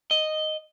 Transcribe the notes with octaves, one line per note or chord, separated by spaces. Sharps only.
D#5